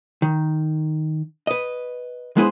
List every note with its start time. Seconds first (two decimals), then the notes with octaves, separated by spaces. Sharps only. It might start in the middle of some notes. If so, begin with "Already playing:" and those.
0.22 D#3
1.47 B4 D#5
2.37 G#3 B3 E4 G#4 B4 C5